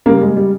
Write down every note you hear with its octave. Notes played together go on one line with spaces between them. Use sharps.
C#3 G3 A#3
G#3
G3